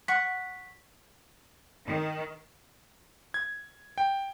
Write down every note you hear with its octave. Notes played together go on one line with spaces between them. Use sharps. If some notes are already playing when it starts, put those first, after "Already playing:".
F#5 C#6 B6
D#3
G#6
G5